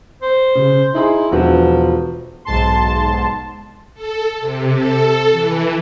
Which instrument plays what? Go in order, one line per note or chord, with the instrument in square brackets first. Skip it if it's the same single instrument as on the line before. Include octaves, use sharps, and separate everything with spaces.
[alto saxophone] C5
[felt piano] C#3
[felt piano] D#4 G#4 C6 [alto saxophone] E4
[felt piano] E1 F#4 B4 [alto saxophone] F3
[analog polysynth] B1 G#2 A5 C6
[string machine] A4
C3
A4
E3